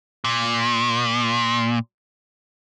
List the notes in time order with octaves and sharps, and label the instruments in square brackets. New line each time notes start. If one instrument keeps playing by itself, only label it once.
[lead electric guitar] A#2